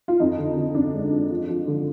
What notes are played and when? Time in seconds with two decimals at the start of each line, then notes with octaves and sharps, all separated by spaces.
0.08 F4
0.20 F2 D#4
0.38 D3
0.56 D3
0.75 F2 D4
0.93 G#3
1.12 F2
1.30 F3
1.49 F3
1.67 D3